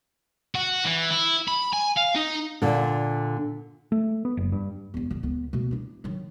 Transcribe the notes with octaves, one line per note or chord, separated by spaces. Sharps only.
F#4
E3
E4
B5
G#5
F5
D#4
A#2 D3
A3
B3
F#1
G2
E2 G2
A#2 D3
D2 B3
B2 A3
D4 E4
D#3 F#3